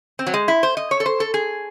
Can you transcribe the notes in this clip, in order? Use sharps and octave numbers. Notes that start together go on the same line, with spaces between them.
C4
F#3
G#3
E4
C5
D#5
C#5
A4
C5
A4
G#4